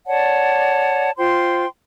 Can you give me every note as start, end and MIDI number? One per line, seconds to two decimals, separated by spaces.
0.07 1.11 73
0.07 1.11 74
0.07 1.11 78
0.07 1.11 81
1.17 1.66 65
1.17 1.66 72
1.17 1.66 79
1.17 1.66 84